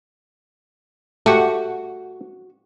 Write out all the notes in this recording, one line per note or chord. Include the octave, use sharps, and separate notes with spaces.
A3 F#4 G4